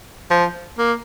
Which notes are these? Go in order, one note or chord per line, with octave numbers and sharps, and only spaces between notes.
F3
A#3